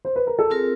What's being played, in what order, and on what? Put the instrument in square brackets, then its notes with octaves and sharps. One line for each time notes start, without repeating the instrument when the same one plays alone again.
[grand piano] C5
B4
A#4
A4
[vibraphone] C4 F4 A#4 [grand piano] G#4